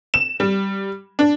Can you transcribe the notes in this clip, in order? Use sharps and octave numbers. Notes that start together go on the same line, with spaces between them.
E7
G3
D4